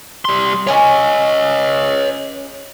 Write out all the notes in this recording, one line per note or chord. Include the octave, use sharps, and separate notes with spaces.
G3 C6
C#4 G#4 C#5 D#5 G#5